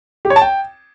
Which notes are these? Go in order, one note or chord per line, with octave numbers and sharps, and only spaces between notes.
G4
C#5
A5
G5